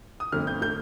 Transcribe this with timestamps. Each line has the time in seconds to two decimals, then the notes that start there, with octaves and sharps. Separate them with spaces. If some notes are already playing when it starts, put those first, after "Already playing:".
0.20 D#6
0.32 G1 F2 D3 A3 F6
0.47 G6
0.61 D3 A3 G6